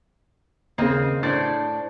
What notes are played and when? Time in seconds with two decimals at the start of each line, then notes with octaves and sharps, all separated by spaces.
0.78 D#2 C#3 A#3 C4 D#5
1.23 A2 D4 C5 A6